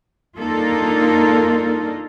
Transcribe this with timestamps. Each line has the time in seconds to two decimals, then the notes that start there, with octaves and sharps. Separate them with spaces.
0.38 A#3 D4 D#4 F4 A4 A#4